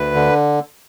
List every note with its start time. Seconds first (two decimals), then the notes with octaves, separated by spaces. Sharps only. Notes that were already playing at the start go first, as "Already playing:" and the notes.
Already playing: D2 B4
0.15 D3